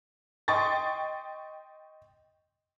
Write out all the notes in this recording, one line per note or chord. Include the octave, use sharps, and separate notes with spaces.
D#5 G5 C6 C#6 A6